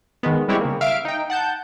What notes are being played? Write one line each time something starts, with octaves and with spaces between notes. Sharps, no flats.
D#3 G#3 B3
G3 G#3 C4 E4 G4 C#5
C#3 A#3
E5 F5 F6 D7
D#4 G5
F#5 A5 G6